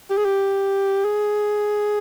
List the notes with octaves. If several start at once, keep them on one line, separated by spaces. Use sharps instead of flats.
G4
G#4
G4
G#4